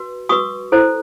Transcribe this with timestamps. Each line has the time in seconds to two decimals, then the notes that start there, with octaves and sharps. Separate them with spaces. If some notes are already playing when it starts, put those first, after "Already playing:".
Already playing: F#4 B4
0.29 F#4 B4 C#6 D#6
0.72 E4 A4 C5